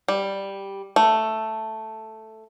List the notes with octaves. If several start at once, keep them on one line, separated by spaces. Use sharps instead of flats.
G3
A3